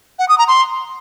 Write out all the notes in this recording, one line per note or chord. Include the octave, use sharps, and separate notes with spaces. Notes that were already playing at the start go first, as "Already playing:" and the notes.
F#5
D#6
A#5
C6